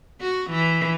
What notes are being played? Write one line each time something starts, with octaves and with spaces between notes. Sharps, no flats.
F#4
E3